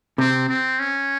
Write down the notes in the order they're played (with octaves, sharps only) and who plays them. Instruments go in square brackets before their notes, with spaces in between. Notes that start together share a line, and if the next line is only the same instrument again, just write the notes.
[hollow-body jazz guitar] C3 [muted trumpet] C4
[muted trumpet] C4
C#4